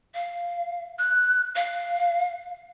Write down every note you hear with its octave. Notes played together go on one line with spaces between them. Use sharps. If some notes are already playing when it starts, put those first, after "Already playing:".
F5
F#6
F5